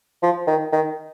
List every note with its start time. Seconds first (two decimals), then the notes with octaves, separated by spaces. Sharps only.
0.23 F3
0.47 D#3
0.73 D#3